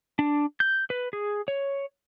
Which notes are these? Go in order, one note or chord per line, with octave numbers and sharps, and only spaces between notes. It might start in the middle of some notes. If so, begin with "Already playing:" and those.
D4
G6
B4
G#4
C#5